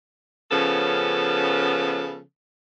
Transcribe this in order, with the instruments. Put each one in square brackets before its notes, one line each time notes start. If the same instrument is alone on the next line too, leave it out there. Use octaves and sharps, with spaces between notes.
[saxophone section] C#3 F3 B3 C#4 A4